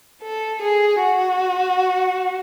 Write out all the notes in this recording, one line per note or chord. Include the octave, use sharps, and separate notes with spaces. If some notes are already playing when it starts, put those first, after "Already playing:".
A4
G#4
F#4